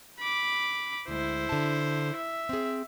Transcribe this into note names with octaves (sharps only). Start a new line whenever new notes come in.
B5 D6
D2 G#3 E4 C5
D3 A5
E5
C4 G#4